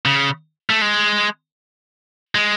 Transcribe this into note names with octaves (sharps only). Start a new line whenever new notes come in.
C#3
A3
G#3
G#3